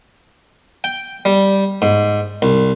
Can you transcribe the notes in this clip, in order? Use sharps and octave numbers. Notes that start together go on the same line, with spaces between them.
G5
G3
G#2
C2